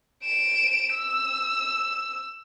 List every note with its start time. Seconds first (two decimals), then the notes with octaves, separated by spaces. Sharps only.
0.24 D7 E7
0.94 E6